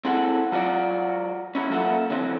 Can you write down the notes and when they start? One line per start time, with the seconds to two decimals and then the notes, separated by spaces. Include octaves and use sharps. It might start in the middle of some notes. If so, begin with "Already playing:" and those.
0.05 C4 E4 G#4 A4 F#5
0.52 F#3 F4 F#4 D5
1.55 C#4 E4 F#4
1.70 F#3 A#3 F4 A4 E5 F#5
2.10 D3 E3 F#3 C4